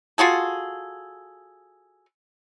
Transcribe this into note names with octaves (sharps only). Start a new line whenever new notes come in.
F4 F#4 G#4 A4